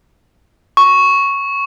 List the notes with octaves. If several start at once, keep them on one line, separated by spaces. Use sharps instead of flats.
C#6